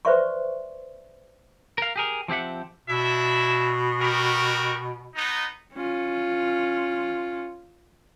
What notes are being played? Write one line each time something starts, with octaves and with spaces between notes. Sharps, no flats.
B4 C5 D5 E5 C6 C#6
A#4 F5
G4 G#4 A#4
F3 C4 G4 E5 F#5
B2 D4 E4 E5
F#4 G4 A#4
B3 D#4
C#4 F4